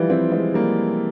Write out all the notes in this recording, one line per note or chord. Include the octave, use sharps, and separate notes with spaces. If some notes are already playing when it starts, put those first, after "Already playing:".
Already playing: E3 F3 G3
C4 E4
G#3 C4
G3 A#3